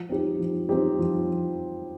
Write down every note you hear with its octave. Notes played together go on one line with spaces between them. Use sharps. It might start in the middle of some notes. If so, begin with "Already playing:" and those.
Already playing: F3
C4 D#4 G4
F3
C4 D#4 G4
F3